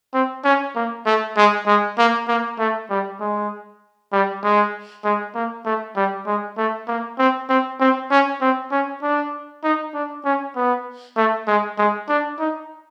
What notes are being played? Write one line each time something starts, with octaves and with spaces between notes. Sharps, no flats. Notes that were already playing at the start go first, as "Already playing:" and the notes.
C4
C#4
A#3
A3
G#3
G#3
A#3
A#3
A3
G3
G#3
G3
G#3
G#3
A#3
A3
G3
G#3
A3
A#3
C4
C4
C4
C#4
C4
C#4
D4
D#4
D4
C#4
B3
A3
G#3
G#3
D4
D#4